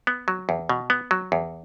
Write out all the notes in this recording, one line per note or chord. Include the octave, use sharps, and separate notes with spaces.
B3
F#3
E2
B2
B3
F#3
E2